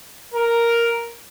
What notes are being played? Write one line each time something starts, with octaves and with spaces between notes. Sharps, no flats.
A#4